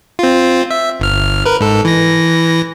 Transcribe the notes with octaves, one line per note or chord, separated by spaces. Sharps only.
C4 F4
E5
G1 F6
A#4 B4
G#2 A4
E3 A#6